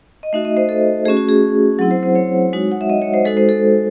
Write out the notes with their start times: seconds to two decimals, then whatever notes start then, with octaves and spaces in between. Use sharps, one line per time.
0.23 D#5
0.33 A3 D#4 F#4 E5
0.45 D#5
0.57 C5
0.69 A4
1.05 A3 C#4 F#4 G#4
1.17 F#4
1.29 G#4
1.79 F#3 C4 E4 F#5
1.91 C5
2.03 C5
2.15 C#5
2.53 G#3 D#4 F#4
2.72 F#5
2.81 E5
2.90 D#5
3.02 C#5
3.14 C5
3.25 G#3 D#4 F#4 A4
3.37 C5
3.49 A4